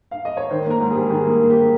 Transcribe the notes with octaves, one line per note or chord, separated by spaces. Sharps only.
F5
D#5
C#5
D#3 C5
A#3
A#4
G#2
G#4
G3
D#3 G#4
A#3
G#4
A#3
G4